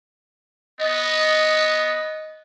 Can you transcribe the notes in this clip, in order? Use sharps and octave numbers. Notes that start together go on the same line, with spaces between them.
B3 D#5